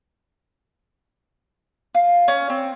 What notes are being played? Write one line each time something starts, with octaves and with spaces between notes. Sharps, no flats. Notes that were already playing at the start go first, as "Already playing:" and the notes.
F4
C#4
C4